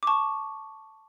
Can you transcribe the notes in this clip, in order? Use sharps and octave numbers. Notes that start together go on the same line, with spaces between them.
D6
A5 C#6